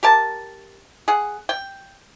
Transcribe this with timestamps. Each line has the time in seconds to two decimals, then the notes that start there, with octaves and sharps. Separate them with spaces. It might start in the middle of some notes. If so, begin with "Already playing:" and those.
0.03 G4 A#4 A5
1.08 G#4 F#5
1.49 G5